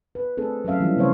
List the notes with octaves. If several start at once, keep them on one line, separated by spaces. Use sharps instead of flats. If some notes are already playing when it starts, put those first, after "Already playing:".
B4
A3 C4 D4 G#4 A4
F#3 C#4 A4 E5 F5
E3 F3 G3 G#3 C#4 D4
C#3 A3 C4 C5 C#5 F5